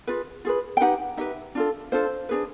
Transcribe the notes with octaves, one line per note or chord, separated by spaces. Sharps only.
F4 G#4 B4
F4 G#4 B4
G5
D#4 G4 B4 F#5
D#4 G4 B4 E5
D4 F4 A4
D4 F4 A4 C5
D4 F4 G#4 B4